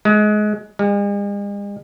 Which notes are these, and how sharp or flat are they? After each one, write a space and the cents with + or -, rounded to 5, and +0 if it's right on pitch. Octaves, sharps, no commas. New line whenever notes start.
G#3 +25
G#3 -45